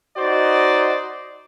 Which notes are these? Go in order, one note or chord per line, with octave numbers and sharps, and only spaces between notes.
D#4 F#4 C5 D5 D#5